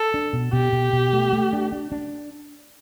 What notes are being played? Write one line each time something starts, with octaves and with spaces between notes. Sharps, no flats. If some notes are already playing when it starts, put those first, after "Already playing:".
Already playing: A4
D4
B2
B2 G4
B2
B2
A3
A3
D4
D4
D4